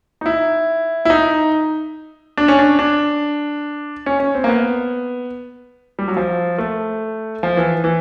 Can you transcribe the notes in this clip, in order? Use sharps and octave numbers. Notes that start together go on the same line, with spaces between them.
D#4
E4
E4
D#4
D4
C#4
D4
D4
C#4
C#4
C4
A#3
B3
G3
F#3
F3
A3
F3
E3
E3